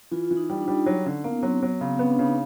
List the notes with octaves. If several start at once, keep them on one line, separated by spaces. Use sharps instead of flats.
E3 F4
F4
E3
D#4
G3 D#4
D4
D#4
G3
D#4
F#3
D3 C#4
A#3 B3
F#3 C4
F#3 B3
C#3 C4
B3 C#4
D4
C#3
D#4